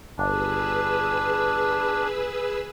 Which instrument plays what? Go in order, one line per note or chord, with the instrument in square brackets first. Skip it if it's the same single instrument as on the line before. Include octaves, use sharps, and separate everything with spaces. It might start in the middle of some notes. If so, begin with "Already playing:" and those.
[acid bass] G1 [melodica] D4 [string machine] G#4 B4 E6